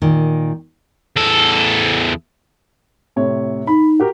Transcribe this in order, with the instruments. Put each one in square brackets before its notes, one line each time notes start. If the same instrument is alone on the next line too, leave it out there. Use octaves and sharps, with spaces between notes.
[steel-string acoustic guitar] A#2 D#3
[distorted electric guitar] E2 A4
[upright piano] A2 C3 C#5
[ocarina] D#4 [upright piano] B5
[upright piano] F#4 G4 A#4